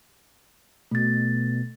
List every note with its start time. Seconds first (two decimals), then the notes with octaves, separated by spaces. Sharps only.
0.91 B2 A3 A6